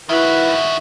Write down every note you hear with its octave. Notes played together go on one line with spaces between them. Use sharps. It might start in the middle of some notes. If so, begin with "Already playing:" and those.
D#3 E4 F#4 B4 E5